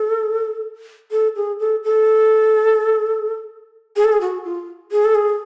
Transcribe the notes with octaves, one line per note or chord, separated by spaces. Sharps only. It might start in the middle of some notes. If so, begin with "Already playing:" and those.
Already playing: A4
A4
G#4
A4
A4
G#4
A4
G#4
F#4
F4
G#4
A4
G#4